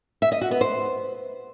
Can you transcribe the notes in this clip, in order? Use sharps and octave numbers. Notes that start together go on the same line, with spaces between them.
E5
D#5
F#4
B3
C5